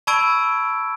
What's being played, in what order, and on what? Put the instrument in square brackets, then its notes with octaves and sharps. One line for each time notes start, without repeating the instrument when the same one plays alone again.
[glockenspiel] A5 B5 C#6 E6 G#6 D7